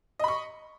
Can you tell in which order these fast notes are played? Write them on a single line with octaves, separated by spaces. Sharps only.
D#5 B5 C#6